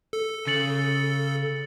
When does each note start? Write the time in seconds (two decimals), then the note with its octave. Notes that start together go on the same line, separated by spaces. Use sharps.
0.13 A4
0.47 C#3 A6 C#7 F#7